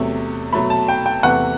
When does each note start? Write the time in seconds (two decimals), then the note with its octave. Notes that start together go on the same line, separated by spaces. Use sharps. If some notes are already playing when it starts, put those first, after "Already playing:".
Already playing: E2 C3 F#3 A3
0.53 B2 F#3 A3 B5
0.70 A5
0.88 G5
1.06 G5
1.23 E2 C3 E3 A3 F#5